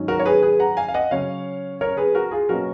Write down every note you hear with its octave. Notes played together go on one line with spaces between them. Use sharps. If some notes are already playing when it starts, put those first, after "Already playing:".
Already playing: G#2 D#3 F#3 C#4
F#4 A#4
C#5
G#4 B4
G#4 B4
F#5 A#5
F5 G#5
F5
D#5 F#5
C#3 F#3 C#4 C#5 F5
A#4 C#5
G#4 B4
F#4 A#4
F4 G#4
B2 F#3 A#3 C#4 F#4 A#4